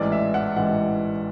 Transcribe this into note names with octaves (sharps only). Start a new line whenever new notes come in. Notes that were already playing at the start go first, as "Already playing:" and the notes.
Already playing: A1 G#2 E3 D5
E5
F#5
A1 G#2 E3 F#5